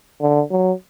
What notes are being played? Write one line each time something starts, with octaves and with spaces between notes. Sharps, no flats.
D3
F#3